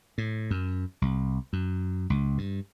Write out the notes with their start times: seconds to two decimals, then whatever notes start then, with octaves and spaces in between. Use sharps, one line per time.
0.18 A2
0.51 F#2
1.02 C2
1.53 F#2
2.10 C#2
2.38 G2